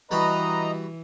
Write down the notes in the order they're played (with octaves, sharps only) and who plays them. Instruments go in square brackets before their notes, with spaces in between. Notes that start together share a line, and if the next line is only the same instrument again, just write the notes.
[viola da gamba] E3 [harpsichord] G3 F#4 B5 [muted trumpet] B4 [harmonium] D#5 A#5